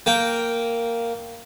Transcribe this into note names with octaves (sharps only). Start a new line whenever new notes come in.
A#3 G5